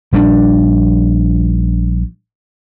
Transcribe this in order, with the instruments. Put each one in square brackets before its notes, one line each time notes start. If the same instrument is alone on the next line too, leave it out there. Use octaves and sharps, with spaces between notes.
[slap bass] A#1 G3 C#4 D4